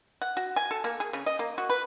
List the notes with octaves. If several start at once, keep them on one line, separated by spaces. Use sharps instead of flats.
F#5
F#4
G#5
A4
A#3
G#4
C#3
D#5
A#3
F#4
B4